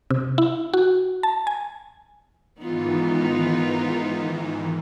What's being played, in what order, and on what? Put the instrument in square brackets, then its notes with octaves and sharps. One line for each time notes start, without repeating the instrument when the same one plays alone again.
[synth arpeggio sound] C3
E4
F#4
A5
G#5
[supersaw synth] G#2 D#3 E3 [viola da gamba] B3 D#4 F4